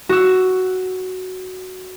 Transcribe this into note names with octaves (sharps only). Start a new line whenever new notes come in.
F#4 E6